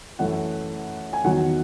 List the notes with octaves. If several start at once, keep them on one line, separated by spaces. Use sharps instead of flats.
F#2 E3 A3 F#5
G#5
E2 D#3 F#3 F#5